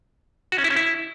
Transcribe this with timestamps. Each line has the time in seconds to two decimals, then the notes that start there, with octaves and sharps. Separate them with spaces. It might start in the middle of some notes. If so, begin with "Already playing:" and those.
0.52 F#4
0.58 C#4
0.64 E4
0.70 C#4
0.76 E4